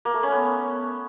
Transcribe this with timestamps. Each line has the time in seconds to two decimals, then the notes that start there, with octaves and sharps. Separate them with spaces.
0.05 A#3
0.14 A3
0.23 C#4
0.32 B3